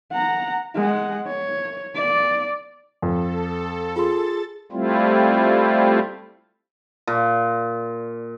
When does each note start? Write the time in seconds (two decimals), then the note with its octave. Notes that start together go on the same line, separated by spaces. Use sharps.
0.12 F#5 A#5
0.76 G#3 F#5
1.27 C#5
1.95 D5
3.02 F2 A4
3.96 F4 G#4 C6 A6
4.72 G3 A3 C4 E4 F4
7.07 A#2